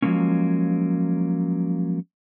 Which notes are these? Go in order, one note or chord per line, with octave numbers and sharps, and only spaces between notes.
F3 F#3 G#3 A#3 C#4